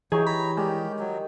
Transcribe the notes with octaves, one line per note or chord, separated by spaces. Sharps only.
E3 F#3 D#4 G4 G#4 C#5
A#5 B5
D#3 G3 G#3 G4
F#3